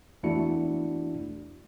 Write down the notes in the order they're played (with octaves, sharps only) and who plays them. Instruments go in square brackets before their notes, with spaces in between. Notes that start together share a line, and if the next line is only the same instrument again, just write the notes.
[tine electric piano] E2 A3 D4 E4 F#4 C#7